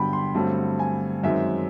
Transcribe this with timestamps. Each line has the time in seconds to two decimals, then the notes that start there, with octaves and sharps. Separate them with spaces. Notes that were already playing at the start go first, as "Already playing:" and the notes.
Already playing: G2 D3 F#3 B3 G5 B5
0.13 C6
0.35 G2 D3 F#3 A3 C4
0.79 G#5
1.24 F#2 D#3 G#3 C4 E5